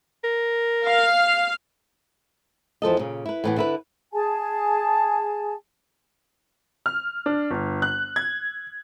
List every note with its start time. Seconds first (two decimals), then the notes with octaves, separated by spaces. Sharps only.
0.24 A#4
0.85 F5
2.82 E2 F3 A4 D#5
2.99 A#2 C#3
3.26 E4 B4
3.44 A2 E3 B3
3.57 D3 E4 B4
4.13 G#4 G#5 A5
6.86 F6
7.26 D4
7.51 G1
7.82 F#6
8.16 G#6